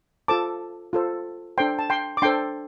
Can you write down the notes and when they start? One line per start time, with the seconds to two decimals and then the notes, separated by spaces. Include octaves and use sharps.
0.28 F4 A4 C5 A5 D6
0.93 F4 A4 C5
1.58 D4 A4 C5 G5 C6
1.79 A5
1.90 G5 C6
2.17 D6
2.22 D4 A4 C5 G5 C6